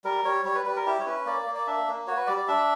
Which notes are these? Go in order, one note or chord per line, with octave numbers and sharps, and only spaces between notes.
G3 A#4
G3 C#5
G3 C#5
B4
G3 B4
A#4
E4 G4
C#5
C#4 B4
A#3 D5
A#3
D5
D4 E5
A#3
F#4 C#5
B4
G3 D5
D5
D4 E5